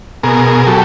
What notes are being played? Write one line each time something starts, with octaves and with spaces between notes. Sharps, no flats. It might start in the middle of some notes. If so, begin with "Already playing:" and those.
B2 G#4 A#4
F#3 G4 A4